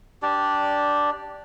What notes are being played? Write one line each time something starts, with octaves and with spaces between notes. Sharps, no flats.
D4 G4 D5